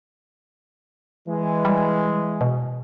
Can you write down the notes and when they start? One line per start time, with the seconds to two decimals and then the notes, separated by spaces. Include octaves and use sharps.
1.27 E3 G#3
1.65 G3
2.41 B2